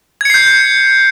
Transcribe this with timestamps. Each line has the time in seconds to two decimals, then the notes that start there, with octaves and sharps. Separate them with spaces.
0.21 G#6
0.25 C#7
0.30 C7
0.34 G6